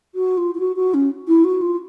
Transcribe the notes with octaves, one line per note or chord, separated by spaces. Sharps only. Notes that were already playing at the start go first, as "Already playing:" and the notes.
F#4
F4
F4
F#4
F#4
C#4
E4
F#4
F4